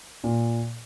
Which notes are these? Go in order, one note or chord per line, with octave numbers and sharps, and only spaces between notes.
A#2